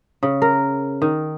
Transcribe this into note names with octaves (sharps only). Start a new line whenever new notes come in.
C#3
A#4
D#3